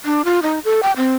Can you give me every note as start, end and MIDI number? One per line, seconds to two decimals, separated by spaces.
0.05 0.25 62
0.25 0.39 65
0.43 0.59 63
0.65 0.80 69
0.83 0.92 79
0.97 1.16 60